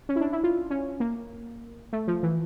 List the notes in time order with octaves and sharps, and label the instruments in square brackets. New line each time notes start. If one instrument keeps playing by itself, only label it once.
[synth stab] C#4
E4
D4
E4
F4
C#4
A#3
A3
F3
E3